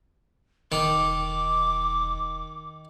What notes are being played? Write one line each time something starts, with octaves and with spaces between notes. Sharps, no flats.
E1 D#3 D6